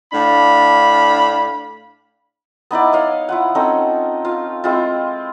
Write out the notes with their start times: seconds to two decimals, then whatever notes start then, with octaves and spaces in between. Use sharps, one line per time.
0.13 A2 D4 F5 B5
2.71 B3 D#4 E4 D5
2.93 C#5 D#5 F5
3.29 E4 F4 F#5
3.55 C4 C#4 D#4 A4
4.25 F4 F5
4.64 G#3 C4 E4 F4